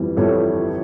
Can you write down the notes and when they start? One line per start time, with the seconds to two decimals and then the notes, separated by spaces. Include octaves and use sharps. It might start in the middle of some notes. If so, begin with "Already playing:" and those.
Already playing: G1 F2 E3 G3
0.17 G1 F2 E3 G3 A4 C#5